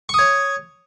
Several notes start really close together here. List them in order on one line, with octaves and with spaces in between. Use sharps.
C#6 D#6 C#5